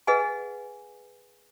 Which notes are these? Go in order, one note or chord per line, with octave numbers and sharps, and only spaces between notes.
G#4 B4 D#5 F#5 G#5